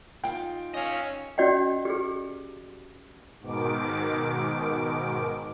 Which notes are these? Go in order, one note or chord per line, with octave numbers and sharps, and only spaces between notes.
D#4 F4 G#4 G5
C#4 D#5 F5
C#4 F#4 D5 D#5 G5
G4 G#4
G#2 B2 D#3 D6